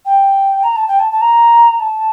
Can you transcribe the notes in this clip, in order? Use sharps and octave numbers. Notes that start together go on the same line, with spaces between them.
G5
A#5
A5
G5
A5
A5
A#5
A5